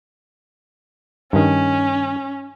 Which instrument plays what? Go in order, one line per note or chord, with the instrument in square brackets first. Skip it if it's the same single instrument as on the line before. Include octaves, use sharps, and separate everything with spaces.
[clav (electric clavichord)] G2 D#3 [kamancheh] C#4